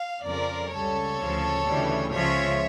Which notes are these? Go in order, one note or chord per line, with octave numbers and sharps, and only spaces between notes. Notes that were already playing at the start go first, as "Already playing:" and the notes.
Already playing: F5
F2 C#3 F3 A#4 D5
C#2 C#3 G3 A4 C#5
D2 C#3 F3
D2 C#3 E3 G3
C#2 C#3 F3 C#5 E5